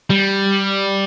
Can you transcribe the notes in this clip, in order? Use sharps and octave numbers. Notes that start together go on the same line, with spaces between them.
G3